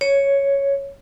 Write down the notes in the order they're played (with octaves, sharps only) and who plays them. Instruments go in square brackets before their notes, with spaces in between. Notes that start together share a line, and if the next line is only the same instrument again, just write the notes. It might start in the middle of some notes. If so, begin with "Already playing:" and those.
[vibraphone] C#5